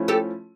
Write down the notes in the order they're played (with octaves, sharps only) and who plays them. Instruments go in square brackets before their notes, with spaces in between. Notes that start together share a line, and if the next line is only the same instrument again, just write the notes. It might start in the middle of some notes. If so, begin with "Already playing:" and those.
Already playing: [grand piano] F3 A3 C#4 E4
[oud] G4 A4